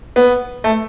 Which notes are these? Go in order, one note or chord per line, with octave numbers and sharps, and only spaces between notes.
B3
A3